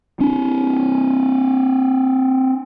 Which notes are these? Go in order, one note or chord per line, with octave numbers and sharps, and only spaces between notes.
C4 D4